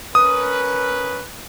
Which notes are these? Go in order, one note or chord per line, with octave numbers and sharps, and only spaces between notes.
C#4 A#4 B4 D#6